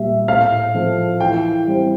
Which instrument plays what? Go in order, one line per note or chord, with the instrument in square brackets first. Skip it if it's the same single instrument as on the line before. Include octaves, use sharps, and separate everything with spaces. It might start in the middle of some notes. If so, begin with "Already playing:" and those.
Already playing: [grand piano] A#2 G3 A#3 E5
A2 F5
F3 A3
E3 G5
G3 C4